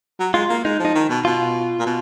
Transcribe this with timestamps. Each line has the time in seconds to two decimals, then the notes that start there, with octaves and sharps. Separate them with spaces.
0.20 F#3
0.34 G#3 F4
0.49 A#3
0.65 G#3 D#4
0.80 F3
0.85 D#4
0.95 D#3
1.09 B2
1.25 B2 F4
1.79 A#2
1.86 B2